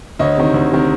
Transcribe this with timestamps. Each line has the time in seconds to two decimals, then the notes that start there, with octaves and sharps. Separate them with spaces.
0.19 D2 C#5 D#5
0.37 C3 D#3
0.54 D2
0.71 C3 D#3